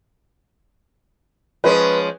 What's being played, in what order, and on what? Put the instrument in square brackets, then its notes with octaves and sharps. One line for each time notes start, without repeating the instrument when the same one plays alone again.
[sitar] F3 G#3 C#4 [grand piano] B4